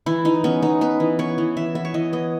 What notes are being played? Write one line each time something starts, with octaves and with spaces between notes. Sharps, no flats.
E3 E4
E3 D#4
B3 C#4
B3 D#4
B3 B4
E3
B3 C#5
E3
E3 E5
B3 E5
C#5
E3 D#5
B3 D#5